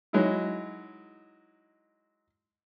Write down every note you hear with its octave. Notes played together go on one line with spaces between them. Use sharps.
F#3 G#3 D#4 E4